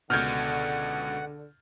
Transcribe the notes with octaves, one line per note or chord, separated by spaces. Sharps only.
C#2 B2 D3 F#5 F6 G6 G#6